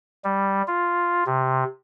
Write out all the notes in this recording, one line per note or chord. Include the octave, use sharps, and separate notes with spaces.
G3
F4
C3